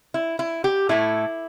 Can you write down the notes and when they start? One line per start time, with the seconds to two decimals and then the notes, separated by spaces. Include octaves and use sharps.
0.14 E4
0.39 E4
0.64 G4
0.89 A2 A3 E4